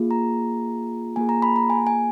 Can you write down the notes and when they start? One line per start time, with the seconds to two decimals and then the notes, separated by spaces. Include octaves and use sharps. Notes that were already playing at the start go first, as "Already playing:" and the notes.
Already playing: A#3 F4 G#4
0.11 A#5
1.16 A#3 F4 G#4 G#5
1.29 A#5
1.42 B5
1.56 A#5
1.70 G#5
1.87 G#5